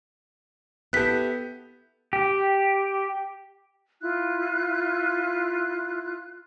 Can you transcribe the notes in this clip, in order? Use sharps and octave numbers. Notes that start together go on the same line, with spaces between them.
B3 E4 G4 A4 F#6 G6 B6
G4
E4 F4 F#6